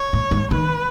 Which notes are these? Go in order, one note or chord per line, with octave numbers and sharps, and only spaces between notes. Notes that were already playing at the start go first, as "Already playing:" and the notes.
Already playing: C#5
A2
G#2
D#3 B4